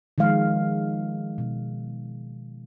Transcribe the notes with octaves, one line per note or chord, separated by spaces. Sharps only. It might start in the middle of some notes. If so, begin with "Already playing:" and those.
D#3 F3 G#3 F5
B2